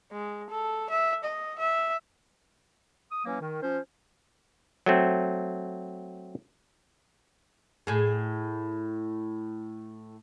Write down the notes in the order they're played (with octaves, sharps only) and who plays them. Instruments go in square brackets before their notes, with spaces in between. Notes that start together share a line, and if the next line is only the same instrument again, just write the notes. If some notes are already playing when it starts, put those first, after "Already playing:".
[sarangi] G#3
A4
E5
D#5
E5
[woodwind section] D#6
E3 F#3 A#3 C#4
D#3
F3 C#4 C5
[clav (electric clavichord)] F#3 A3 C4
[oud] A2 G#4